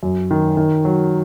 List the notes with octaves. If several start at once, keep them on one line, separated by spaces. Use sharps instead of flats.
F#2
D#3
D#3
F#3